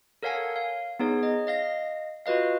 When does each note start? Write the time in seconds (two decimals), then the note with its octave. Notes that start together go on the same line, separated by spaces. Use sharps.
0.23 A4 A#4 C#5 F5 F#5 G#5
0.56 F5
0.99 B3 D#4 G#4 C#5
1.23 D#5
1.47 D#5 F5 A#6
2.26 F4 F#4 B4 D#5 F5